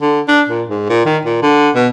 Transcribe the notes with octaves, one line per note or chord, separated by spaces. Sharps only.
D3
D4
A#2
G#2
A#2
D#3
A#2
D3
B2